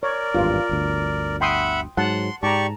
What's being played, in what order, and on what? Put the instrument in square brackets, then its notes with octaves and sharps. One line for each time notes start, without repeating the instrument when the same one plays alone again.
[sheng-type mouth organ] A#4 D5 [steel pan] C#5
[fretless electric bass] G#1 E2 G2 [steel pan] F4
[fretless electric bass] G1 D2
[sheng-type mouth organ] E5 F#5 B5 [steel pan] G5 C6 D#6
[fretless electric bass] G#2 F#3 [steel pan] F#5 A5 [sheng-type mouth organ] C6
[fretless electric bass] G#2 [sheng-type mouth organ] G4 D5 C#6 [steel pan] A5 A#5